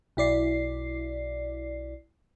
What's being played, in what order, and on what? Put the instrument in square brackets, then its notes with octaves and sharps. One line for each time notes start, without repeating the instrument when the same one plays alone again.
[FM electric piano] B1 E4 D5 C7